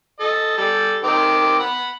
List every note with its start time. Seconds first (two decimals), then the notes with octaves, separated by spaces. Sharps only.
0.20 A4 D#5
0.58 G3 A4
1.03 D#3 C4 D6
1.60 F#5 B5